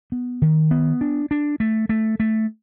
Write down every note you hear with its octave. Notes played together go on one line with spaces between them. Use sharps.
B3
D#3
B3
D4
D4
A3
A3
A3